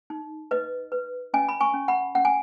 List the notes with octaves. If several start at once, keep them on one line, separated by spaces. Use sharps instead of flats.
D#4
B4 D#5
B4
C#4 D#5 G#5
B5
G#5 C#6
C#4
F#5 B5
C#4 F#5
G#5